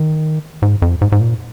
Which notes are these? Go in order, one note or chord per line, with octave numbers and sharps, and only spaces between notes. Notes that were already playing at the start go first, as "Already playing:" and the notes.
Already playing: D#3
G#2
F2
G#2
G#2
A#2